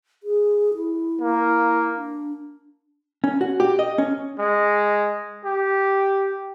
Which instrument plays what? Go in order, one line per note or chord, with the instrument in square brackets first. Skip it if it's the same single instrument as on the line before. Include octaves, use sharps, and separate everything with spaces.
[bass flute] G#4
E4
[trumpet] A#3
[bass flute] D4
[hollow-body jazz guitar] C#4
F#4
G4
D#5
C#4
[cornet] G#3
G4